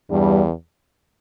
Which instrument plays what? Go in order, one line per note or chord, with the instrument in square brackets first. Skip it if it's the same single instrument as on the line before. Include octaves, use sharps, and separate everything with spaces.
[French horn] E2 [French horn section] G2 G3